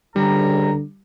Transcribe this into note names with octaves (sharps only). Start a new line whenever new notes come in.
C#2 D3 G3 A#5